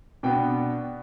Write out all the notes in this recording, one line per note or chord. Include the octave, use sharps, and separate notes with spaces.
B2 B3 D4 G5